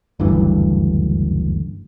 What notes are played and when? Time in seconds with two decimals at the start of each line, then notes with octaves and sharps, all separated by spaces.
0.20 F#1 D2 G2 E3